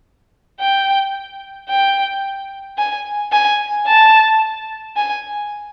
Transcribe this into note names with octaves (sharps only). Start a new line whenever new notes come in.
G5
G5
G#5
G#5
A5
G#5